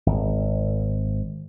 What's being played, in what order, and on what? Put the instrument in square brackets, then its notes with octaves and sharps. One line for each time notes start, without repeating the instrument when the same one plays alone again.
[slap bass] G#1